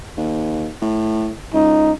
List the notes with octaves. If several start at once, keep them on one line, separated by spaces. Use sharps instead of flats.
D#2
A2
C#2 D#4